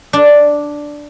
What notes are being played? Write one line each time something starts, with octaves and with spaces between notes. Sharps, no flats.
D4